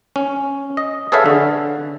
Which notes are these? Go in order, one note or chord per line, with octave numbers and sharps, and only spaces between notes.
C#4
D#5
G#4 A4 B4 C#5 E5 F5
D3